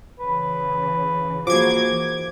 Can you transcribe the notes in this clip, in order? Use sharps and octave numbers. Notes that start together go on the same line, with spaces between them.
C#3 E3 B4
F3 A#3 F#4 G#4 D6 G#6
E3